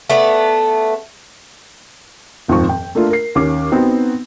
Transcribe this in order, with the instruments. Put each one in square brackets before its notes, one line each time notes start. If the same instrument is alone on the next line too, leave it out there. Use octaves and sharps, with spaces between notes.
[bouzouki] A3 B3 D5
[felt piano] D#1 F2 G#2 F3 C4 C#6
G5
A3 A#3 D4 F4
A#4 C7
D#2 C#4 D6
B3 C4 D#4 F#4